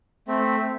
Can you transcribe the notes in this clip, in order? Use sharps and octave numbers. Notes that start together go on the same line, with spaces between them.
A3 C4